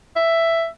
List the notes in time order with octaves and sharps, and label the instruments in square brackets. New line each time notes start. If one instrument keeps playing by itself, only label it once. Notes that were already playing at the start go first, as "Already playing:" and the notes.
[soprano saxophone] E5